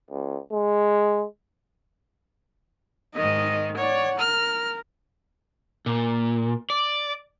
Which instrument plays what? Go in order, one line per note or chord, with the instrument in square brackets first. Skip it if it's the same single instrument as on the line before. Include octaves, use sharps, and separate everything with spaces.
[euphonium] C#2
G#3
[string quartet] G#2 D#3 [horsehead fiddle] D#5
[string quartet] C#5 [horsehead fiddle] D5 F#5
[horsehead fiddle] A#4 [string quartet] F6
[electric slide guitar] A#2
D5